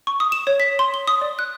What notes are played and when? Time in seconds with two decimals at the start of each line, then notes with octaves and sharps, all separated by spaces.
0.07 C#6
0.20 D#6
0.32 E7
0.47 C#5
0.60 B6
0.79 C6
0.94 G7
1.07 D#6
1.21 D5
1.39 F#6